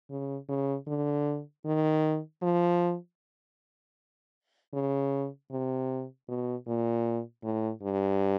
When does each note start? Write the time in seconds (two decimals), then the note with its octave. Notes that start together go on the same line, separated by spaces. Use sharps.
0.10 C#3
0.49 C#3
0.87 D3
1.66 D#3
2.42 F3
4.73 C#3
5.51 C3
6.29 B2
6.67 A#2
7.44 A2
7.82 G2